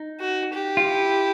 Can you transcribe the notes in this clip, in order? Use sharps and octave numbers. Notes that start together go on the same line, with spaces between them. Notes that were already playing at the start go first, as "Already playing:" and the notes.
Already playing: D#4
F#4
G4
F4
E4